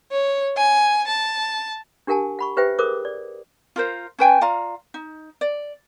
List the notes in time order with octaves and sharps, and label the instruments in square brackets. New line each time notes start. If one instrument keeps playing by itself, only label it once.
[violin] C#5
G#5
A5
[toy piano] D4 G4 A#4 F#5 G#5 A5
F#5 B5 C#6
G4 B4 C5 E5 G5
G#4 A#4 C5 D6 D#6
D5
[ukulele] F4 A#4 C5
C#4 B4 G5 G#5
F4 D5 F5 A#5
D#4
D5